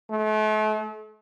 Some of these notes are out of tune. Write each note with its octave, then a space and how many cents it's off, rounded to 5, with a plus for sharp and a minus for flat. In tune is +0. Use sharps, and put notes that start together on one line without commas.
A3 -40